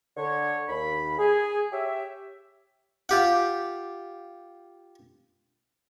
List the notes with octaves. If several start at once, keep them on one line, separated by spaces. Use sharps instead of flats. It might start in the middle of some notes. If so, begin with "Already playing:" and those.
D3 C#5
D#2 B5
G#4
G4 C#5 E5
F4 G4 F#5